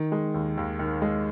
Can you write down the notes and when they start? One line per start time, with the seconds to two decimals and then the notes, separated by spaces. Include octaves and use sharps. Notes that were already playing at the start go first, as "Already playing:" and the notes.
Already playing: D#3
0.12 G#3
0.34 D#2
0.57 D#2
0.79 D#3
1.02 G#3